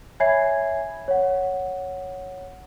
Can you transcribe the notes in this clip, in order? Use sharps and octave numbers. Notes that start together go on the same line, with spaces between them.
C#5 E5 G#5 B5 G#6 C7
C#5 F#5